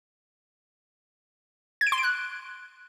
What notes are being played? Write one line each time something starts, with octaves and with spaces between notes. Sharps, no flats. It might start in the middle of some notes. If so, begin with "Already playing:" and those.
G#6
D7
C6
D7
F#6